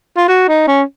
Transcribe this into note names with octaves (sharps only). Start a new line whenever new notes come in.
F4
F#4
D#4
C#4